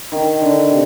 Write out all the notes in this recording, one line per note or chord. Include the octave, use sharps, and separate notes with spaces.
D#3
D3
C3